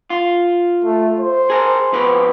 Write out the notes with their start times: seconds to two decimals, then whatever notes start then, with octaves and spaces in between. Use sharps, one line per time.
0.10 F4
0.85 A3
1.20 C5
1.50 G#4 A#4
1.92 F2 B2 B4